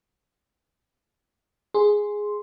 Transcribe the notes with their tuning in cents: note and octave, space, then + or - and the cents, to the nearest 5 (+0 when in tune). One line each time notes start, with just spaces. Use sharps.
G#4 +0 C6 +0